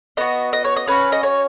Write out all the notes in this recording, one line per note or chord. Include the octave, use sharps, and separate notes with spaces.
B3 F#4 D#5
D#5
C#5
D#5
C#4 F#4 B4
D#5
C#5